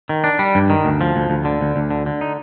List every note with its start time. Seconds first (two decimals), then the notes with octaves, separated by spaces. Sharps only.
0.09 D#3
0.24 D4
0.39 G3
0.55 G2
0.70 D#3
0.85 D2
1.01 F3
1.16 D2
1.30 D2
1.45 D3
1.61 D2
1.76 D2
1.91 D3
2.06 D3
2.21 D#4